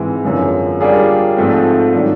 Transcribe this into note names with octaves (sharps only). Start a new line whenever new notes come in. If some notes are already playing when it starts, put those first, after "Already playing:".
Already playing: G#2 E3 G#3 C4
F#2 D3 F3 G#3 B3
G3 A#3 D4 F4 G#4
G#2 F3 A3 C4
D#3 F#3 A3 D4 F4